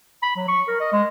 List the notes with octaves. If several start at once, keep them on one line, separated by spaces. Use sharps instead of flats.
B5
F#3
C#6
A#4
D#5
G#3